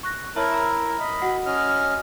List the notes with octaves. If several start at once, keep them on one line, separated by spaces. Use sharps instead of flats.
C#6 F#6 A#6
E4 A#4 C#5 E5 A5
A#5 E6
D#5 B5
F#4 F#5
C#4 D#5 F6